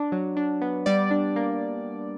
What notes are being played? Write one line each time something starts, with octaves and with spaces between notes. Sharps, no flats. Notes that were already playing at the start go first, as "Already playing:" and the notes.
Already playing: D4
F#3
D4
B3
G3 D5
D4
A#3